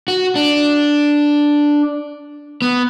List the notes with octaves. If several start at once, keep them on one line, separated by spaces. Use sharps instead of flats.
F#4
D4
B3